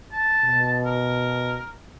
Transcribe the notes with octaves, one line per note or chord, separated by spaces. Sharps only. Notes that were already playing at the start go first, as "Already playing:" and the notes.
A5
B2
A#4